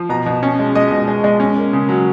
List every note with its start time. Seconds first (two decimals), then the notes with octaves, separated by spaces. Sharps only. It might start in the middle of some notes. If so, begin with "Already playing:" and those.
Already playing: F3
0.09 B2 A#5
0.26 B2
0.43 C#4
0.59 G#3
0.75 G#3 D#5
0.91 B2
1.08 G#3
1.24 G#3
1.40 C#4
1.57 A#3
1.73 C#3
1.89 F#3